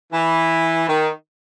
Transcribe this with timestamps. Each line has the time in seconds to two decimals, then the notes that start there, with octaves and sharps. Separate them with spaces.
0.12 E3
0.88 D#3